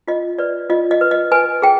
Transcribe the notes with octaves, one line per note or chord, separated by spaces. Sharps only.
F4 D#5
B4 D5
F4 D#5
D#5
B4
D#5
B4 G#5
G#4 G5